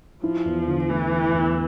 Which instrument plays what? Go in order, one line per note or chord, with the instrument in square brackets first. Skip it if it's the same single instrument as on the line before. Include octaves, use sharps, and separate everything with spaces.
[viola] F3 [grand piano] E4
[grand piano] E2
D3
[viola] E3 [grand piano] A3
[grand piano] E4
E2